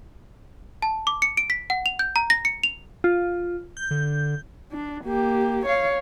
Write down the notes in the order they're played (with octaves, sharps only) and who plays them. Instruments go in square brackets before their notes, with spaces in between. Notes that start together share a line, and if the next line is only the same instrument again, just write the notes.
[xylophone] A5
D6
C#7
D7
B6
F#5
F7
G6
A#5
A#6
C#7
F7
[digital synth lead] F4
G6
[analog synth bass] D3
[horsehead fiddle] D4
A#3 G4
C#5 F5